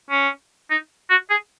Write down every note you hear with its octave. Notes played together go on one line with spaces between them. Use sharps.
C#4
D#4
F#4
G#4